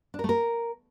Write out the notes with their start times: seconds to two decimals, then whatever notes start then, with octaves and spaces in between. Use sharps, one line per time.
0.14 D4
0.19 A#4
0.24 A3
0.29 A#4